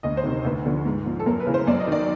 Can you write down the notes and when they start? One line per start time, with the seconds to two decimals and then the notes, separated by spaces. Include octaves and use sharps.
0.03 D2 D#5
0.17 C5
0.24 C3 D#3
0.45 D2 B4
0.65 D3 F3
0.85 G#2
1.06 F3
1.20 A4
1.26 F#2 A#4
1.40 B4
1.46 C#3 E3
1.54 C5
1.67 F#2 D5
1.80 D#5
1.87 D#3 D5